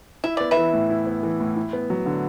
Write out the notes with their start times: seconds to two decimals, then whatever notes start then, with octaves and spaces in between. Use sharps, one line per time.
0.24 E4 E5
0.37 B3 D5
0.51 B4 E5
0.57 E3
0.73 A2
0.90 E4
1.07 B3
1.23 E3
1.40 A2
1.56 E4
1.73 B3
1.90 F#3
2.06 D3